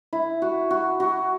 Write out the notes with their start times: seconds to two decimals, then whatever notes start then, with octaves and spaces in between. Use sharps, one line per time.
0.13 E4
0.42 F#4
0.71 F#4
1.00 F#4